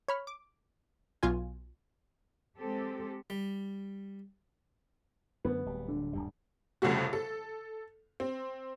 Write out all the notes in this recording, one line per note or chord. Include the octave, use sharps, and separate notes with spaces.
C#5 B5 F6
D6
B1 B2 F4 G#5
G#3 C4 G4 A4
G3
F#2 D3 B3
D1 G3
D3
D1 G2 G3
C2 F2 C#3 G3 A3 F#4
A4
C4